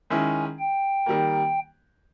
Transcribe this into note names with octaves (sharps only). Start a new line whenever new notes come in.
D#3 G#3 C#4 E4 G#5
G5
D#3 G3 A#3